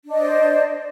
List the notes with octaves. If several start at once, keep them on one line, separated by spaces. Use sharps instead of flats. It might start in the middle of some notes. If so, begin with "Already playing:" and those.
D4 C5 D5 D#5